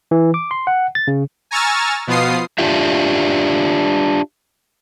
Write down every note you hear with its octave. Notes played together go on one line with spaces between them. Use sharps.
E3
D6
C6
F#5
A6
C#3
G#5 A#5 C#6 E6 F6 A6
B2 F3 B3 F4 D#6 C7
D4 F4 G4 E5